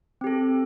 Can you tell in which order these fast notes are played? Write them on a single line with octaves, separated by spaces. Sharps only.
C4 G4 A4